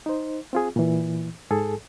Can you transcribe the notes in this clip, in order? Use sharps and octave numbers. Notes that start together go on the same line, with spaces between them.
D#4 C5
C4 F4 G#4
A#2 E3
G#2 G#4 A4